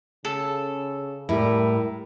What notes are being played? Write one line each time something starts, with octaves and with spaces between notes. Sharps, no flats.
C#3 A4
A2 G3 E4 A#4